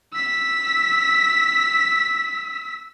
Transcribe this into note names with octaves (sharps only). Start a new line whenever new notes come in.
E6 B6